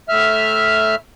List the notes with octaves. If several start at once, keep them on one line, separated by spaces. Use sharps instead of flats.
A2 E5 F6